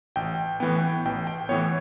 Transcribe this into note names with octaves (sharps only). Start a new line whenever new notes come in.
A1 G5
A2 E3 B3 G5
A1 G5
G5
A2 E3 B3 C#5